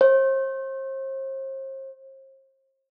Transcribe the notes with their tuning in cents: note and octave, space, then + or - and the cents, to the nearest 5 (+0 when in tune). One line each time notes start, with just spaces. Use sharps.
C5 +40